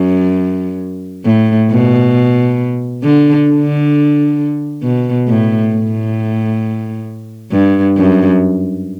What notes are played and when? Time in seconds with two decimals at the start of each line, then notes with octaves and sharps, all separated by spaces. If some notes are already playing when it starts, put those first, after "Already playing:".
Already playing: F#2
1.25 A2
1.71 B2
3.04 D3
3.50 D3
4.83 B2
5.28 A2
5.73 A2
7.51 G2
7.97 F#2